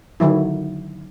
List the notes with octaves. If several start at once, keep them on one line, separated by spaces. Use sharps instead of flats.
D3 D#3 F#3 E4